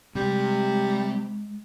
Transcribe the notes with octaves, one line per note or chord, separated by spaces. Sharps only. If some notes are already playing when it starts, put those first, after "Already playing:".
C3 G3 G#3